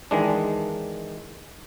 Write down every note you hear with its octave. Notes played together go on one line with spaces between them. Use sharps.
D#3 E3 G#3 D4